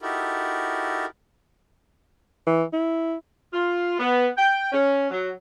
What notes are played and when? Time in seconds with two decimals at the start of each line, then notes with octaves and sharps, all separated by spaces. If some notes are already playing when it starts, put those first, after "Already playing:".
0.02 D#4 E4 F#4 G4 A4 A#4
2.47 E3
2.73 E4
3.53 F4
3.99 B3
4.37 G5
4.72 C#4
5.10 F#3